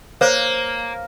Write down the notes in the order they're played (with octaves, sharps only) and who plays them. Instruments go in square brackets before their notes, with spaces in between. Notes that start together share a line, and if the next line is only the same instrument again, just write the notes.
[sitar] A#3 [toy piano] C5 C#5